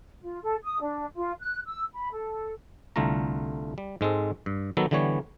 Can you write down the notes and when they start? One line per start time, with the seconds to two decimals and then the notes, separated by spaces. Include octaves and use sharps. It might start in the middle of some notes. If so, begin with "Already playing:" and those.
0.20 F4
0.43 A4
0.62 D#6
0.79 D4
1.15 F4
1.39 F#6
1.66 E6
1.93 B5
2.11 A4
2.96 C2 D3 A3 F4 A#5
3.78 G3
4.01 G#2 G#3 C4 A4
4.46 G2
4.77 D#3 F#3 B3 A4
4.91 D3 E3 G3 B3 C#5